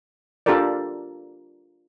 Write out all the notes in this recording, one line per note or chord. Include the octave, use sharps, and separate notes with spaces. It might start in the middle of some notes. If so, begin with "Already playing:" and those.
D4 F4 G4 A4 A#4 D5